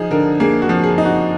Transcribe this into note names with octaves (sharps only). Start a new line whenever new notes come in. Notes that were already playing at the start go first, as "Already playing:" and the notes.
Already playing: F3 D#4 G#4
D3 A#4
A#3 G#4
F#4
F3
G#4
D#4
F#4